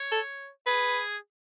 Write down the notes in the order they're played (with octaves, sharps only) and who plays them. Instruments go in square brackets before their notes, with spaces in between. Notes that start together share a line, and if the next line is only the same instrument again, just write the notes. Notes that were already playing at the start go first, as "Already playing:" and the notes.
Already playing: [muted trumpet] C#5
[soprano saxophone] A4
[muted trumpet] G#4 [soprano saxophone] B4